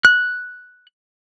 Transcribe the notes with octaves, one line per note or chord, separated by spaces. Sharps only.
F#6